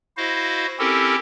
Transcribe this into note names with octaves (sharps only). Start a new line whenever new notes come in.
E4 F#4 C5 D#5 F5
C4 C#4 E4 G4 A4 A#4